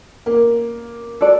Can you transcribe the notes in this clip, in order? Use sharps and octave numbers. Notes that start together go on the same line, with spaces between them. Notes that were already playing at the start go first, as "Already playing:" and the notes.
A#3
D4 F#4 A4 D5